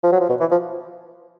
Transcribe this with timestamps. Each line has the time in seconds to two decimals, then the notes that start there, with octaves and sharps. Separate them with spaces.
0.04 F3
0.12 F#3
0.21 F3
0.29 B2
0.40 E3
0.52 F3